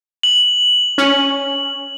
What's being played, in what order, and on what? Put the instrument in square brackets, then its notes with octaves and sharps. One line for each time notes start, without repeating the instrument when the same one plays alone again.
[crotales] F#7
[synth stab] C#4